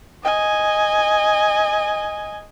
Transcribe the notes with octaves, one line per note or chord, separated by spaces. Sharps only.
D#5 G#5